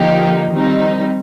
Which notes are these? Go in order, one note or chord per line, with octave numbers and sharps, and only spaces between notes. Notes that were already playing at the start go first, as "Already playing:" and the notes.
Already playing: D3 F3 A#3 D#4 G4
D#3 G3 C4 D#4